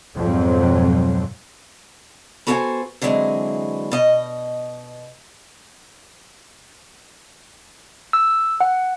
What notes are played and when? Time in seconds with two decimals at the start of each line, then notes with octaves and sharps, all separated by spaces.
0.17 F2 G#2 B2 F#3 C4
2.47 B3 F#4 A4 C5 G5 G#5
3.02 D3 E3 F#3 G#3 C4
3.91 B2 D#5
8.13 E6
8.60 F#5